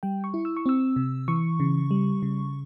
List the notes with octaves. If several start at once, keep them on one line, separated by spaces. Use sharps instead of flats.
G3 G5
C#6
E4
E6
C#6
C4 E6
C3
E3 C#6
C#3
G3
C#3